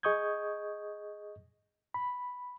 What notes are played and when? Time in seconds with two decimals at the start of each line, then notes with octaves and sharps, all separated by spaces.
0.03 G#4 D#5 C#6 D#6 G6 G#6
1.94 B5